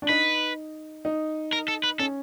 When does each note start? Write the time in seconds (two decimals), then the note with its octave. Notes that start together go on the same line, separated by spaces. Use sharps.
0.02 D4
0.09 D#4 B4
1.05 D#4
1.53 A#4
1.68 A4
1.84 B4
1.99 C#4 A4